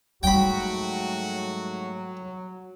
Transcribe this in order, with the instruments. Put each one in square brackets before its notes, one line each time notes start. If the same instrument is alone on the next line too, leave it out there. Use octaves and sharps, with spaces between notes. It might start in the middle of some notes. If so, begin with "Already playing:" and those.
[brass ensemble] G#2 A3 F#4 [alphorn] F#3 [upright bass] G3 [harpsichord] G5 B5